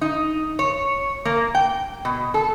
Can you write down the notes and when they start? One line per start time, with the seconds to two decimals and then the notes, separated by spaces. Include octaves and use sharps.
0.01 D#4
0.59 C#5
1.25 A#3
1.55 G5
2.05 B2
2.34 A4